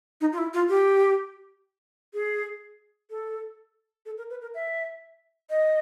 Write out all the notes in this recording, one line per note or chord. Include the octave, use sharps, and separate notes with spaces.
D#4
F4
E4
F4
G4
G#4
A4
A4
A#4
B4
A#4
E5
D#5